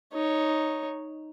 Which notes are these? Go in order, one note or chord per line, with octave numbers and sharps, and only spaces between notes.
D#4 C#5